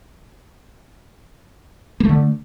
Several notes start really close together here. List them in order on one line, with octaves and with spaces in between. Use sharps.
A#3 A3 D3